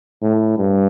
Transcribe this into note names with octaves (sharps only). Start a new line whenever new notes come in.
A2
G2